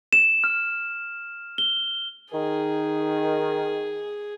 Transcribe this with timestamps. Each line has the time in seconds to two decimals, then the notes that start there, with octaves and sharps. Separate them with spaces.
0.13 E7
0.44 F6
1.58 G7
2.32 D#3 G#4